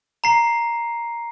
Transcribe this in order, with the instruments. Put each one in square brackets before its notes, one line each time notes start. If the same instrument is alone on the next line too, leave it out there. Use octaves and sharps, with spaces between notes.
[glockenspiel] A#5 C7